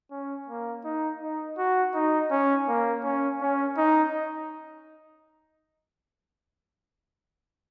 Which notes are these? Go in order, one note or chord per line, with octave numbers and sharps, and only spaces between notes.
C#4
A#3
D#4
D#4
F#4
D#4
C#4
A#3
C#4
C#4
D#4